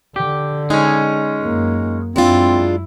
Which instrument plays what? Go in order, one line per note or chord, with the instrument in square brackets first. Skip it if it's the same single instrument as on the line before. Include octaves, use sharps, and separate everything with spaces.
[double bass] D3 [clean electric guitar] G4
[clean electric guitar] G#3 C#4 [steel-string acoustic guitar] D#4
[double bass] F#2 A#3
[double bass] F#2 E4 [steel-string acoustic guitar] G#3 D4 F4 [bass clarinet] C4